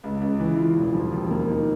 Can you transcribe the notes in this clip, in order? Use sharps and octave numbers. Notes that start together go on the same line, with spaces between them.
C#2
C#2
E3
F4
E1
F3
D#2
A#3
D#3